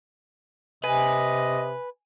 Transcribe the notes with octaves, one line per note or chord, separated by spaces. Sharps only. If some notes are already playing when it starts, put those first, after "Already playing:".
C3 B4 D#5 G#5